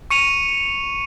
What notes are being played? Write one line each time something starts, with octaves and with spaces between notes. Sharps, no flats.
C#6 C#7 D#7 F7